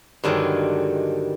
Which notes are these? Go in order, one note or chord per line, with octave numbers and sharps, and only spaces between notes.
G2 D3 D#3 F#3 G#3